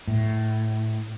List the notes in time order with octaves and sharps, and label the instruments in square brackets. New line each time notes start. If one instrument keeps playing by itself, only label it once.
[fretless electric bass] A2